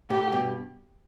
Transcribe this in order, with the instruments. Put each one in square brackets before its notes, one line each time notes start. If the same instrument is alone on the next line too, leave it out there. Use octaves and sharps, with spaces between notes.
[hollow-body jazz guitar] A2 [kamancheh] G4
[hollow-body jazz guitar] G2 B2